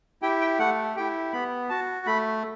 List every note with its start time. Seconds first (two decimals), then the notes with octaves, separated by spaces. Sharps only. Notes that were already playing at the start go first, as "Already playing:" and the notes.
0.22 E4 G4 G5
0.41 G5
0.59 A3 F#5
0.96 E4 G4 G5
1.33 B3 B5
1.69 F#4 A5
2.06 A3 B5